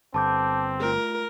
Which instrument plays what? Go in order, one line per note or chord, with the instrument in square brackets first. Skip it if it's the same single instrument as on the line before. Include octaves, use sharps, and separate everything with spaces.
[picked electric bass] G1 [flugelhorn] C4 [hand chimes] A5 D6 G6
[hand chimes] A3 F4 [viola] A#4